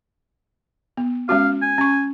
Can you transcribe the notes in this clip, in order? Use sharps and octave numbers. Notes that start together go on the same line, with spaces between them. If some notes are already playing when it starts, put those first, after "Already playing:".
B3
G#3 C#4 F#4 F5
G#5
C#4 C#6